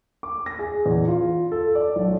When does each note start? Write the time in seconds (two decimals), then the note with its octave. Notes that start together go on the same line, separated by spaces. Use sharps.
0.23 D6
0.46 A#6
0.59 G#4
0.86 E2
1.08 F4
1.52 A4
1.75 D5
1.96 B1